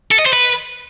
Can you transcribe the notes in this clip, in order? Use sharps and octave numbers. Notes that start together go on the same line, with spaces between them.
A4
D#5
C5
B4